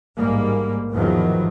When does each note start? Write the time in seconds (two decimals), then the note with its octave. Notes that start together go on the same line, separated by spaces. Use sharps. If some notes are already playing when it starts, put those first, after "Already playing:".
0.16 A1 G#2 G3 A#3
0.91 E2 G#2 D#3 F3 F#3